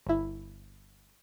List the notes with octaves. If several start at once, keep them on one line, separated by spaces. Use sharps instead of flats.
G1 E4